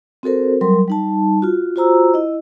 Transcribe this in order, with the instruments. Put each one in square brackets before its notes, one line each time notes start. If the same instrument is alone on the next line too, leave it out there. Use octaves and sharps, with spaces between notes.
[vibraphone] C4 F#4 A4 A#4 C5
F#3 G3 A#4 C6
G3 D#4 A5
F4 F#4
F4 F#4 C5 A#5 E6
E4 D#5